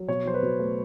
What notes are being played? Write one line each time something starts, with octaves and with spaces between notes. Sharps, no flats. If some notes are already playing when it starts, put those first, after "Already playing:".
Already playing: F#3
B2 C#5
F#3 C5
B4
B2
A3